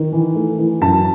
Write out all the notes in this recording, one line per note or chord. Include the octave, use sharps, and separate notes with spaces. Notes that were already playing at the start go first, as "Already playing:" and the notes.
Already playing: D#3
E3
A3
E3
F#2 A5